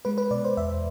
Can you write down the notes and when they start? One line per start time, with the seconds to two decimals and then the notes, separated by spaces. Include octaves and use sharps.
0.05 G#3 B4
0.18 B4
0.31 B2 D5
0.44 C5
0.57 E2 E5